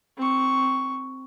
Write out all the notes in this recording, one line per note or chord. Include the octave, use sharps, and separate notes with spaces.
C4 C#6